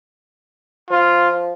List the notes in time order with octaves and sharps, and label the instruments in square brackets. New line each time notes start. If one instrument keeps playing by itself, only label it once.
[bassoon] F3 [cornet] F4